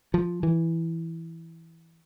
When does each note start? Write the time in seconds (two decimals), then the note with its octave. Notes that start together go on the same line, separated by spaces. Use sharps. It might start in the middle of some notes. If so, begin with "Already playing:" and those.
0.14 F3
0.43 E3